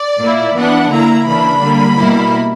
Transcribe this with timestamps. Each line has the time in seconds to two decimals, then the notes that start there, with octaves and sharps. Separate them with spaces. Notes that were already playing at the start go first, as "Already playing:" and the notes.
Already playing: D5
0.20 A#2 A#3 E4
0.57 E3 B3 D4 F#5
0.91 D3 A#3 E4 A#5
1.27 C#3 E3 A#3 D4 B5
1.62 D3 G3 A#3
1.98 B2 G3 A#3 E4